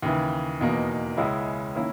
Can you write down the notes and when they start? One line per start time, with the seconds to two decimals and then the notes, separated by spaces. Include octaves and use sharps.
0.03 D#2 C#3 E3
0.61 E2 B2 A#3 D#4
1.17 C#2 C#3 G#3 C#4 E4
1.76 D#3 A#3 C#4 E4